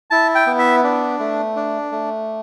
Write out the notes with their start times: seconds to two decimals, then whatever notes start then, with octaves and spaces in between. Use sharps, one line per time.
0.10 E4 A5
0.35 G5
0.47 B3
0.59 E5
0.84 D4
1.20 A3
1.56 D4
1.92 A3